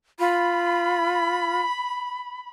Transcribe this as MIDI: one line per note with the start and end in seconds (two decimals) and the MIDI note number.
0.19 1.60 65
0.19 2.49 83